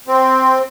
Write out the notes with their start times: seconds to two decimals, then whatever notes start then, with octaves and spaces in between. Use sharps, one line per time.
0.07 C4